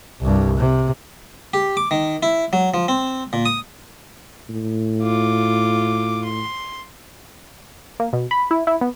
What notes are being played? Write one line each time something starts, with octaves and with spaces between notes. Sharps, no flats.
C2 G2
C3
G4
D6
D#3
E4
F#3
F3
C4
A#2
D#6
A2
F4 D6
C6
A#3
B2
B5
E4
E4
B3